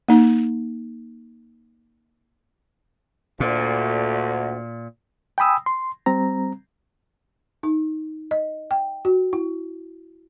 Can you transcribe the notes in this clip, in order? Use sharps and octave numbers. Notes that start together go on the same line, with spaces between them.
A#3 D#4
D2 A#2
G5 G#5 B5 D#6 E6
C6
G3 C4 A#5
D#4
D#5
G5
F#4
E4